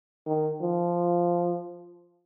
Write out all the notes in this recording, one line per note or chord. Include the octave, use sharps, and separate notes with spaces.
D#3
F3